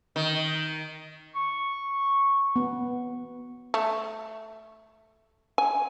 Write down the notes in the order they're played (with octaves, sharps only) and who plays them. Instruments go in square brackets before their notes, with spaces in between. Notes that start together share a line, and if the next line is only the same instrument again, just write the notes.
[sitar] D#3
[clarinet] C#6
[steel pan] B3
[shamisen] A3
G#5